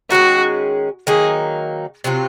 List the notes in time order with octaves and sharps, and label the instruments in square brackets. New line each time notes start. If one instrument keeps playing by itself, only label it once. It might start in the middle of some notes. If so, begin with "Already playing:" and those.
[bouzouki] D#3 G#3 C#4 G#4 [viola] F#4
[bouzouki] D#3 F#3 A#3 D#4 [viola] G#4
[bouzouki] C3 F#3 C4 F4